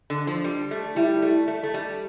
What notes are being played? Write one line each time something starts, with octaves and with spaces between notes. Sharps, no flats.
D3
F3
G3
A3
G3 E4
A3
A3
A3
G3